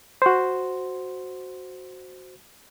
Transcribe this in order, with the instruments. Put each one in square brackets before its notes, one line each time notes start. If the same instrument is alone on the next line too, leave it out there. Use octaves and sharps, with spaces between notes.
[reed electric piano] F#4 C5